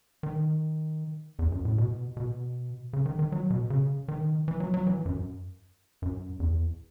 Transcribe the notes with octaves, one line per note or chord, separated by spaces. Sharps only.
D#3
E2
F#2
A2
B2
B2
C#3
D#3
D#3
F#3
B2
C#3
D#3
E3
F#3
F#3
E3
F#2
F#2
E2